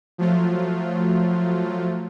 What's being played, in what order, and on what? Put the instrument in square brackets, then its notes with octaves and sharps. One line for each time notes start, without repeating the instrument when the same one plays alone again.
[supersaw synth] F3 F#3 A3 F4